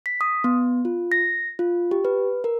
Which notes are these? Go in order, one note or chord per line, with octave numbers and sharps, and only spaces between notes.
B6
D#6
B3
F4
A#6
F4
G4
B4
A#4